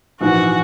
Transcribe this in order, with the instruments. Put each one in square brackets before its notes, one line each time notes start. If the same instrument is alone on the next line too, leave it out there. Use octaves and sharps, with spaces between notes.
[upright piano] A#1 G#2 E3 [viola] F#4